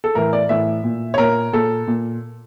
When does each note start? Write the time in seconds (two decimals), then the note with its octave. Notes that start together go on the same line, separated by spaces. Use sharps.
0.04 A4
0.15 A2 E3 A#4
0.33 D5
0.49 A2 E3 E5
0.84 A#2
1.14 C#5
1.18 A#2 A#4
1.53 A#2 A4
1.88 A#2